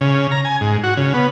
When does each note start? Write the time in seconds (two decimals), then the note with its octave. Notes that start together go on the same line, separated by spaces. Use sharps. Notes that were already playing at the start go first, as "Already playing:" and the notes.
0.01 C#3
0.31 A#5
0.45 G#5
0.61 G#2
0.84 F#4
0.97 C#3
1.14 B3